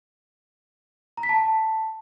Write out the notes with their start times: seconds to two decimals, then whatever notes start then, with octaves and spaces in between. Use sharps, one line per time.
1.17 A#5
1.23 B6
1.29 A5